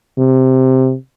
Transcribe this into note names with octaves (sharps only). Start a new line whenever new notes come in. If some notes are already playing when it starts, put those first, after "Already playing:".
C3